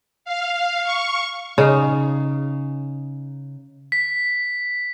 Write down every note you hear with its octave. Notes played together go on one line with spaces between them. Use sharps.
F5
C#6
C#3 D#4 F5
B6